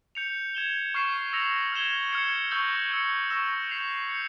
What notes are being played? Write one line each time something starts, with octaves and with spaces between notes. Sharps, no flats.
G6 C#7 F7
G#6 E7 G7
C#6 F6 C7 E7
E6 A#6 C#7 F7
F6 G#6 E7 G7
F6 G#6 C#7
C#6 E6 G6 A#6
E6 G6 C#7
C#6 E6 A#6 E7
G6 C7 F7
G6 C#7